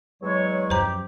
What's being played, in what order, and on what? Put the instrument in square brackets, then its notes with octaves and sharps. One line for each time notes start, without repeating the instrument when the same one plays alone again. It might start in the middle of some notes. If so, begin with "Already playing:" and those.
[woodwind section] E2 F#3 G#3 [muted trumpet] C#5
[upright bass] F#2 F3 [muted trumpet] G4 [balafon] C5 A#5